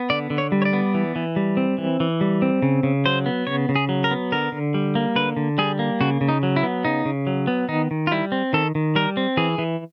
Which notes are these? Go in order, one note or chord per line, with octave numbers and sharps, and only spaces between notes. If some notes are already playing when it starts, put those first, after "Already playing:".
Already playing: B3
D3 D5
D3
C#5
G3
C#5
D5
B3
E3
E3
G3
C4
E3
E3
G3
C4
C#3
C#3
F#3 C5
B3
C#3 C#5
C#3
G#4
F#3
A#4
B3
D3 A#4
D3
G3
A#3
D3 B4
D3
G3 G#4
A#3
C#3 F#4
C#3
D#4
F#3
E4
B3
C#3 D#4
C#3
F#3
B3
D#3 D#4
D#3
F4
G3 E4
C4
D#3 A4
D#3
G3 A#4
C4
E3 G#4
E3